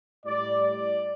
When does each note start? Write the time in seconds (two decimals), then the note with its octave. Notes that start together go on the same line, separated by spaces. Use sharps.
0.24 A2 G3 D5
0.62 D5